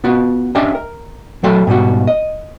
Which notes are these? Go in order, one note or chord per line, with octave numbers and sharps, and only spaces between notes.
B3 F4 F#4
C#4 D4 G4 D#5 E5 G5
A#4
F#3 A3 F#4 A4 G5 C6
G#2 B2 G3 F#4
D#5